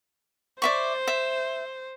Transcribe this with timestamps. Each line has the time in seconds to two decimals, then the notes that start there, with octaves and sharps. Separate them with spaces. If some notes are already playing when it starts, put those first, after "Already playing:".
0.62 C5 D5 E5 C#6
1.08 E5